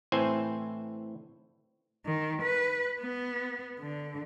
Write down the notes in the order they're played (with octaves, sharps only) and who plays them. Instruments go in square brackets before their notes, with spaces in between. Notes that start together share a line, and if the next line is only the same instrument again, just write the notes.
[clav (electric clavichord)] A2 E3 C4 C5 G#5
[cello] D#3
B4
B3
D3